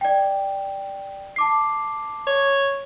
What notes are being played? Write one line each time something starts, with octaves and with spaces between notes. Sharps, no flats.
D5 G5
A5 D6 C7
C#5